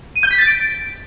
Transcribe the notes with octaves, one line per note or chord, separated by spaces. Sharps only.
D#7
G6
B6
A6
D7